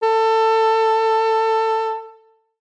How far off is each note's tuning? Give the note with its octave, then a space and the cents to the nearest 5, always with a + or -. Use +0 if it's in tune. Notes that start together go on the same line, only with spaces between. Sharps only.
A4 +20